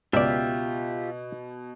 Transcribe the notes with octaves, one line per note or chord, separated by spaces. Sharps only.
C#2 B2 F4 G4 D5 E5